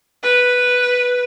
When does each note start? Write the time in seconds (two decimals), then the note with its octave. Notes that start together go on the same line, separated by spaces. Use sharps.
0.23 B4